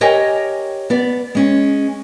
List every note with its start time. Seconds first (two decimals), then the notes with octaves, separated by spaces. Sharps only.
0.01 G4 A#4 C#5 D#5 G5 G#5
0.90 B3 D5
1.35 G#3 C#4